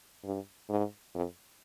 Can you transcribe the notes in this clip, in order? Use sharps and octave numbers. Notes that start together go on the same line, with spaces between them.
G2
G#2
F2